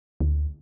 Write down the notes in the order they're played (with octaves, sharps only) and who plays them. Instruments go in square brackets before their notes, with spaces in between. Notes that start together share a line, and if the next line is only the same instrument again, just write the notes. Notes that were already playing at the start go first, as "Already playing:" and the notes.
[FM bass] D2